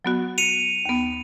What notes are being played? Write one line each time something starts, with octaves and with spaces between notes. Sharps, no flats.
F#3 B3 F#4
C#7 D#7 F7
D#2 B3